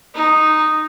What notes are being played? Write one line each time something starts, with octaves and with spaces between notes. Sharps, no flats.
D#4